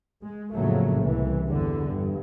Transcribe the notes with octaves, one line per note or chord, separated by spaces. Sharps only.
G#3
F2 A2 C#3 F#3 A3 A#3
C2 E3
E2 G2 D3
G2